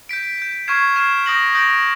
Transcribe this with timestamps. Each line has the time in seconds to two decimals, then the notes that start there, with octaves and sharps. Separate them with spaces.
0.09 G6 B6 D7
0.38 G6 B6 D7
0.68 C#6 F6 G#6 C7 E7
0.96 C#6 F6 G#6 C7 E7
1.26 D#6 G6 A#6 D7 F#7
1.55 D#6 G6 A#6 D7 F#7